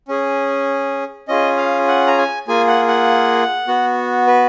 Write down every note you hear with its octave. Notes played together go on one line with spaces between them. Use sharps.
C#4 G#4
C#4 F4 G#4 D#5
F5
F#5
A#5
G#5
A#3 F4 G#4 G#5
F#5
F#5
B3 F#4
B4